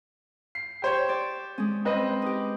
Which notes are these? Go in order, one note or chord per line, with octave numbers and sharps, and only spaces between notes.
C7
G4 C5 C#5
D5
G#3 C#4
C4 B4 D#5
D#4 G4